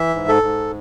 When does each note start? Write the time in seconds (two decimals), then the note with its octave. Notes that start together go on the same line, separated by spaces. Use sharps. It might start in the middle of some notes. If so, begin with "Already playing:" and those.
Already playing: E3 E5
0.15 G#2
0.28 A4
0.43 G#2